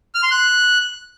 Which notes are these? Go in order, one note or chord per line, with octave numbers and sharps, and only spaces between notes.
F6
C6
F#6